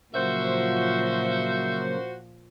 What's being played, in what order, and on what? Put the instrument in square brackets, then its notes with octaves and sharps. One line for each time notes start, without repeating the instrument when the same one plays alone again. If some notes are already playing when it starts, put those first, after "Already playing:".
[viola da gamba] A#2 F3 [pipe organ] C#3 F#3 A#3 [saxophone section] F#4 C5 [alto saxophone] E5